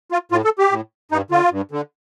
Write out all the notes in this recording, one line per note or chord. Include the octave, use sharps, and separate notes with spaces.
F4
A2 F4
A4
G4
A2
G2 D#4
D3 F4
G2
D3